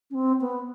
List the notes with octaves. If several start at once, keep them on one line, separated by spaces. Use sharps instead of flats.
C#4
C4
B3